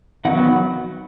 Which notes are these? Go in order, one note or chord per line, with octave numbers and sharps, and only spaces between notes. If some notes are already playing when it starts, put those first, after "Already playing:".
D#3 F#3 B3 F#5